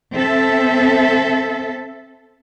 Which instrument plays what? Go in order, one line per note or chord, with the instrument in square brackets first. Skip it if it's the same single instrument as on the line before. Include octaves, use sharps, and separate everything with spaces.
[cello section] C4 A4 E5